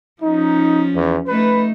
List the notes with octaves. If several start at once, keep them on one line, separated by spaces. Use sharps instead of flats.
F3 C#4 D#4
E2
A3 D#4 B4